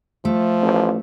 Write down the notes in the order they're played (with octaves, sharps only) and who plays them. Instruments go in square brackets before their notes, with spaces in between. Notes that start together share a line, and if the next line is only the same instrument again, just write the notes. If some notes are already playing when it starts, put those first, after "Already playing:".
[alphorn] F3 [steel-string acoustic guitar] A3
[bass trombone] A1